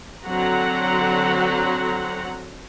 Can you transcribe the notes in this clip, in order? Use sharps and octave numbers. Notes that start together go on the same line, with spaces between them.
D3 F#3 C4 F#5 A#5